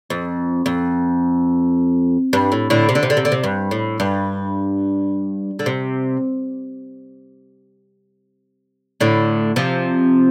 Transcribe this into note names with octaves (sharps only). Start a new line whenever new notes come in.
F2
F2
G2
A2
A2 D3
C3
D3
C3
D3
C3
D3
C3
G2
A2
G2
D3
C3
A2 D3
C3 F3